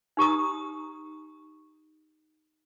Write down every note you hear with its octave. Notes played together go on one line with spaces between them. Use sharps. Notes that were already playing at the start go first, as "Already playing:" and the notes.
D#4 G4 A#5 D#6